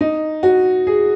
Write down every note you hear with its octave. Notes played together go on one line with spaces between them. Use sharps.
D#4
F#4
G#4